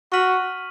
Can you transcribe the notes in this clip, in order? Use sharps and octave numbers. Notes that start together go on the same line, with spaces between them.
F#4 C#6 F6 B6 D#7 F#7